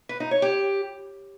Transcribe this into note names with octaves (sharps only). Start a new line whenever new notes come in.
B4
D#4
C#5
G4